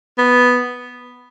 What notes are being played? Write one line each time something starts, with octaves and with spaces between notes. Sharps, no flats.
B3